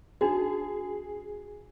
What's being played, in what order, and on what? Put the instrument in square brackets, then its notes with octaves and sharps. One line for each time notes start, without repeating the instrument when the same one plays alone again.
[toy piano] D4 D#4 F#4 [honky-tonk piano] G#4